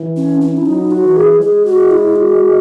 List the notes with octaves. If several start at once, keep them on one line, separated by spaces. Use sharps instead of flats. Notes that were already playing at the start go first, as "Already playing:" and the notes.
Already playing: E3
C#4
C#4
E4
F#3 D#4
F#4
E3
G#4
G#3 G#4
F#4
E4
F#4